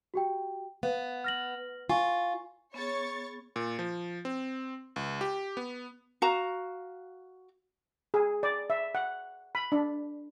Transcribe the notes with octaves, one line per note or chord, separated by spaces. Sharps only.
F#4 G4 G5
B3 F5
F6 A#6 F#7
F4 G#5 C#6
B3 G#4 C#5 C#6 A6
A#2
F3
C4
C#2
G4
B3
F#4 F5 A#5
G#4
D5
E5
F#5
B5
D4